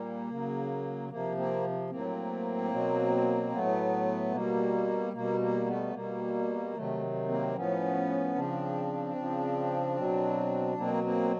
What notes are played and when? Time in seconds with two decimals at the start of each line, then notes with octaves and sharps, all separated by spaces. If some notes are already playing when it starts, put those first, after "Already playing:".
Already playing: A#2 G3 A#3
0.29 C#3 F#3
1.09 C3 F3 A#3
1.37 A#3 C4
1.90 A2 F#3 A#3 C4
2.71 B2 F#3
3.51 A2 F#3 A3 B3
4.32 B2 G3 A#3
5.13 B2 G3 A#3
5.40 A#3
5.66 A3 B3
5.93 B2 G3 A#3
6.74 C3 D#3 F#3 A3
7.28 A#3 C4
7.55 A2 F3 B3 C#4
8.35 C#3 F3 C4 D4
9.15 C#3 F3
9.96 B2 F#3
10.77 B2 F#3 A#3 C4
11.04 A#3 C4